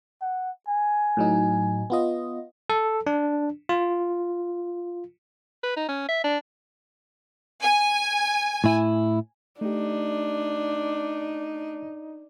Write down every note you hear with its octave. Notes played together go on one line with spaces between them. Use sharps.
F#5
G#5
A2 F#3 D#4
B3 F4 D#5
A4
D4
F4
B4
D#4
C#4
E5
D4
G#5
A2 E4
A3 D4 D#4 G4